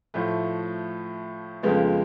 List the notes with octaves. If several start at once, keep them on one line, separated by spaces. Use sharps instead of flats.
A2 F3 A3
F2 C#3 F3 G#3 B3